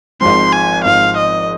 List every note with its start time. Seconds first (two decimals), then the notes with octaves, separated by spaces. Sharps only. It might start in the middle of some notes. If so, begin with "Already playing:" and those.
0.21 G#1 G#2 F3 C4 C6
0.53 G#5
0.84 G#1 G#2 F3 C4 F5
1.17 D#5